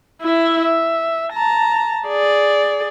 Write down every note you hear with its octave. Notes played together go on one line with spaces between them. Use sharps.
E4 E5
E5
A5 A#5
G#4 D5